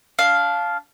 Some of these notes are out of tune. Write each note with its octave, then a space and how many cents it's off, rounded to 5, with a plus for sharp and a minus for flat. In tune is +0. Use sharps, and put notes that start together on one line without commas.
D4 -20 F5 +0